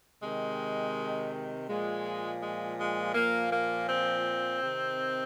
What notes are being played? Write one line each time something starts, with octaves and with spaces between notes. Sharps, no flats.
C3 D#3 G#3
A#2 F3 G#3
G#3
G#3
A#2 F3 A#3
A#3
C4
C3 D#3